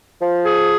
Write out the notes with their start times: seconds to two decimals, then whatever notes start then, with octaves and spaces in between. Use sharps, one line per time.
0.21 F3
0.44 G#4